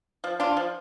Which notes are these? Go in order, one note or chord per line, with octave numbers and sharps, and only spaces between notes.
F3
D4 F4
F3